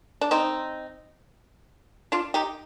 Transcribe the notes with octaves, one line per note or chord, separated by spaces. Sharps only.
D4
C4 D#4
D4 F4
D#4 G4